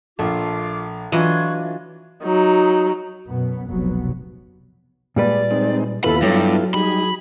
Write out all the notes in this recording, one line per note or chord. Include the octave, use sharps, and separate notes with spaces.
A#1 A3 F4 D6
E3 F#3 D4 F4 D#5 C#6 F#6 G#6
F#3 D#4
F#2 B2 B3
F1 C2 B2 F#3 B3
A#2 G3 G#3 B4 D5
G#3 C4 D#4
D#2 B2 B3 E4 F4 A4 B4 B5
G2 F#3 A4
G3 D#4 G#4 B5